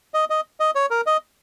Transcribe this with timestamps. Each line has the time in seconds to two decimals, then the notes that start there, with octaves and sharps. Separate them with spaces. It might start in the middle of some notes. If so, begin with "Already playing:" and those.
0.14 D#5
0.30 D#5
0.60 D#5
0.75 C#5
0.91 A#4
1.06 D#5